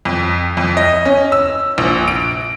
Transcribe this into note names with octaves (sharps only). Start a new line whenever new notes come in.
F2
F2
D#5
C#4
E6
A#1
D7